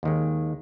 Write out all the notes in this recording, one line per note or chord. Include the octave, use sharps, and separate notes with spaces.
D#2 D#3 G#3